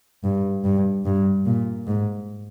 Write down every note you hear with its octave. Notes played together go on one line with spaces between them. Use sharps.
G2
G2
G2
A#2
G#2